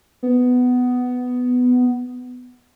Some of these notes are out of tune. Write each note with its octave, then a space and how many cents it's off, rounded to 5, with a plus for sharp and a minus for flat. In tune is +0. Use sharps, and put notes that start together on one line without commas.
B3 +10